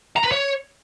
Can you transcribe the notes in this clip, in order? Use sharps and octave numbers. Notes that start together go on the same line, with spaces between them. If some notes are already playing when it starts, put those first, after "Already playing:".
A#5
B4
C#5